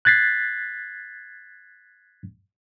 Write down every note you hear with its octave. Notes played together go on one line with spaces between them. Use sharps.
F#6 G#6 A6 B6 C7